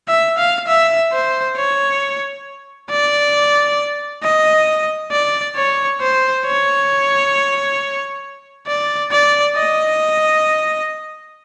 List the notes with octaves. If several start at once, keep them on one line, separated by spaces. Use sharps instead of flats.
E5
F5
E5
C5
C#5
D5
D#5
D5
C#5
C5
C#5
D5
D5
D#5